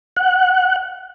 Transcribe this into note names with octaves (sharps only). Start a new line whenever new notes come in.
F#5